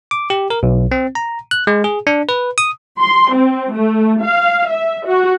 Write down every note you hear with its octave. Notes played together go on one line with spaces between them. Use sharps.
D6
G4
A#4
B1
C4
A#5
F#6
G#3
G#4
D4
B4
D#6
C6
C4
A3
F5
E5
F#4